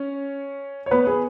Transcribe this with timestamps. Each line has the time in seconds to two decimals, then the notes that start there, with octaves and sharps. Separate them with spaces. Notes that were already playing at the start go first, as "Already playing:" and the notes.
Already playing: C#4 C#5
0.86 C#5
0.91 B3 B4
1.07 G#4